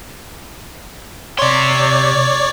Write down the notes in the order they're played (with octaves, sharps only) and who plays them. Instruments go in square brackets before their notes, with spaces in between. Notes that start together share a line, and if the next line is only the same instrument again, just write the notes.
[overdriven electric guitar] C3 C6 [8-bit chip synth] C#5 D5